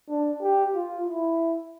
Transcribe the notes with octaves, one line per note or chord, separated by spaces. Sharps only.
D4
G4
F4
E4